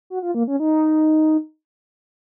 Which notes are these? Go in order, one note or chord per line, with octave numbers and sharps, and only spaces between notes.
F#4
F4
A#3
C#4
D#4